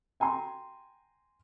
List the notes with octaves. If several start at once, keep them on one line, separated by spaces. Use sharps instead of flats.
G5 G#5 A#5 C6